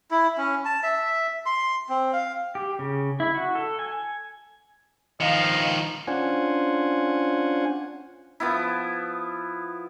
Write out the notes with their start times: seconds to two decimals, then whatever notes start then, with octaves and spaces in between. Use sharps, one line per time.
0.11 E4
0.38 C#4
0.65 A5
0.83 E5
1.46 C6
1.89 C4
2.13 F5
2.55 G4
2.79 C#3
3.20 E4
3.34 F#4
3.55 A4
3.79 G#5
5.21 D#3 F3 D#5 F5
6.07 C#4 D4 F4 C5 F#5 G#5
8.40 F3 B3 E4